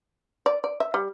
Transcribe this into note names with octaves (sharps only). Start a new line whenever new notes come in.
D5
D5
E5
G3